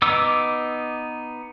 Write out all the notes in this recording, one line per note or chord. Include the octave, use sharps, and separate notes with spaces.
B3 D#4 D6 E6